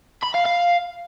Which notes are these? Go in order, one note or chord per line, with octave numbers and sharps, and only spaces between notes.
B5
F5
F5